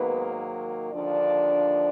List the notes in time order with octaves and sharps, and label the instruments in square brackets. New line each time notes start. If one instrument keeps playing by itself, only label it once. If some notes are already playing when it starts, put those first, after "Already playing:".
Already playing: [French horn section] G#2 D#3 F#3 A#3 B3 B4
D#2 D3 F3 D4 D5